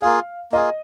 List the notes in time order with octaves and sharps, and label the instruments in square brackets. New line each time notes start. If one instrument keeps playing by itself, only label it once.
[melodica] A#3 F4 G#4 [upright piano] F5
[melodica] A#3 F4 G#4 [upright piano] D#5